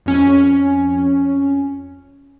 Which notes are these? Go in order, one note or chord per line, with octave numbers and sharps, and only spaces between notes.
F2 C#4